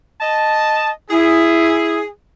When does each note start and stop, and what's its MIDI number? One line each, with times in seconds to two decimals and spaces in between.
0.22 0.90 75
0.22 0.90 81
1.10 1.95 64
1.10 2.07 68